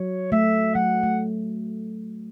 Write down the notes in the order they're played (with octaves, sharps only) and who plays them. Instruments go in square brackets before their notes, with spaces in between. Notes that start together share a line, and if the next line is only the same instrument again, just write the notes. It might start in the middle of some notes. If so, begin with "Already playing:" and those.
Already playing: [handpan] F#3 [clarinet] C#5
[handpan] A3 [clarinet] E5
[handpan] F#3 [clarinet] F#5
[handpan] A3